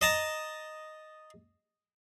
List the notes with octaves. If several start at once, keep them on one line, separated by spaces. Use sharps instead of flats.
D#5 A5 A#5